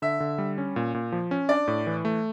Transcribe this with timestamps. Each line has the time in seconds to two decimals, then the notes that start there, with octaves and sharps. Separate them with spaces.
0.02 D3 E5
0.20 D3
0.38 G3
0.58 C#4
0.76 A#2
0.94 A#2
1.12 F3
1.31 C#4
1.49 D4 D5
1.68 A2
1.87 E3
2.05 A3